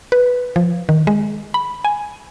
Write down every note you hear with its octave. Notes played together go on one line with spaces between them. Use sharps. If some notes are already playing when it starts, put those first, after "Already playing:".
B4
F3
D#3
G#3
B5
G#5